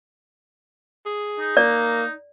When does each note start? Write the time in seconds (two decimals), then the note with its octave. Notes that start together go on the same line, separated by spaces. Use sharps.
1.06 G#4
1.39 D#4
1.57 A#3 D5